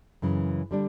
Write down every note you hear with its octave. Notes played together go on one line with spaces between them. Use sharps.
F#2 C#3 E3
D3 G3 D4